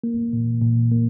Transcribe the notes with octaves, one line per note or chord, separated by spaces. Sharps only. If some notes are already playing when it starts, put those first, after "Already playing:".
A#3
A#2
A#2
A#3